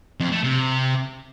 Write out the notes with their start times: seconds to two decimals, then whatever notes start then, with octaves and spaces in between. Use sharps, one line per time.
0.20 F2
0.32 A3
0.44 C3